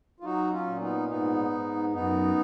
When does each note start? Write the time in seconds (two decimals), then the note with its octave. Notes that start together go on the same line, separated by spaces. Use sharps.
0.20 F4
0.24 F#3 D#4 F#4
0.52 C#4 F4
0.67 A#2
0.80 B3 D#4
1.09 G#2 B3 D#4
1.51 G#2
1.93 F#2 B3 D#4